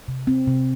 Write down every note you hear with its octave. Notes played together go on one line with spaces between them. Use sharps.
C3
C4
C3